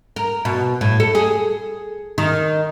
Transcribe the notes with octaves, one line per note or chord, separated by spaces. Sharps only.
A#4
B2
A2
A4
G#4
D#3